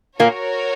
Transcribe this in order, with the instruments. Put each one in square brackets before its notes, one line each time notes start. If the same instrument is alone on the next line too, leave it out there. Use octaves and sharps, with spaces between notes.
[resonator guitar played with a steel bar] A#2 A#3 [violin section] F#4 A#4 C#5